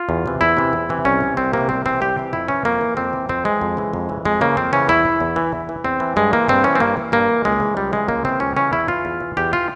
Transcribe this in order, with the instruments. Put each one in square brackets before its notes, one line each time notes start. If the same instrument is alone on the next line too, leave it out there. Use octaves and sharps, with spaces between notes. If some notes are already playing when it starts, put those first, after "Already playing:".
Already playing: [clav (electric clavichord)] F4
E2
C3 E3
E2 E4
C3 E3
E2
C3 E3
C2 C#4
C3 E3
C2 C4
C3 E3 A#3
C2 C4
C3 E3 C4
C2 G4
C3 E3
F2 E4
E3 C#4
F2 A#3
E3
F2 C4
E3
F2 C4
E3 G#3
F2
C#3 E3
F2
C#3 E3
F2 G#3
C#3 E3 A#3
F2 C4
C#3 E3 C#4
E2 E4
E3
E2
E3
E2
E3
E2 C4
E3
G2 G#3
E3 A#3
G2 C4
E3 C#4
C4
G2 A#3
E3
G2 A#3
E3
C#2 G#3
C#3 E3
C#2 G3
C#3 E3 G#3
C#2 A#3
C#3 E3 C4
C#2 C#4
C#3 E3 C#4
E2 E4
E3 F4
E2
E3
E2 G4
E3 F4